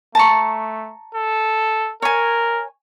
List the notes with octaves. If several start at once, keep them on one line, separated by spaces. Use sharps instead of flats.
A3 A5 A#5 C#6
A4
A#4 C#5 G#5